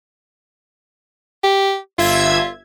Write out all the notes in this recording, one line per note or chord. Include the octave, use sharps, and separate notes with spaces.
G4
G1 F4 E5 G#6